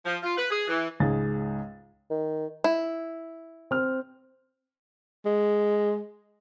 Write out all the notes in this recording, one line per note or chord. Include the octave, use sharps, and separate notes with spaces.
F3
F4
B4
G#4
E3
C#2 G#2 G#4 A6
D#3
E4
C4 F6
G#3